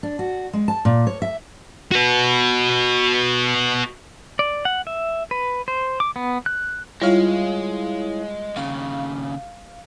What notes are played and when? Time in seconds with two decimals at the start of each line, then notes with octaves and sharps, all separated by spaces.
0.03 D4
0.19 F#4
0.53 G#3
0.68 A5
0.85 A#2
1.07 C#5
1.22 E5
1.91 F#4 B4
4.39 D5
4.65 F#5
4.87 E5
5.31 B4
5.68 C5
6.00 D6
6.16 B3
6.46 F#6
7.02 G3 G#3 E4 F4 C#5 F5
8.56 D#2 C#3 F5